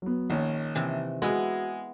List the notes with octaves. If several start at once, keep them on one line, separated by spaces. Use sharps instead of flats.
F#3 B3
A#1 D#3 C#4
C3 E3
G#3 B3 E4 F#4